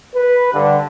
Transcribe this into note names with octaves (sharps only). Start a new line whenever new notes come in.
B4
G2 D3